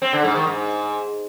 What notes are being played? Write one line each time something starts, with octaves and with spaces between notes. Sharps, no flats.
C4
D3
G#2
D#3
G#2